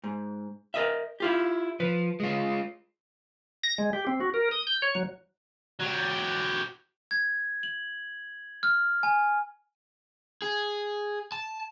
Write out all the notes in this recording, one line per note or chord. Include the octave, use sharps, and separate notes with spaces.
G#2
A#4 D#5 E5
E4 F4 G4
F3 B4
G#3 F4
A#6
G#3
G4
C4
F#4
A#4
D#6
G6
C#5
F#3
F#3 G4
G#6
F#7
F6
G#5
G#4
A5